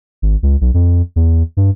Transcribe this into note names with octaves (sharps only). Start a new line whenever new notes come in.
G#1
C#2
B1
F2
E2
G2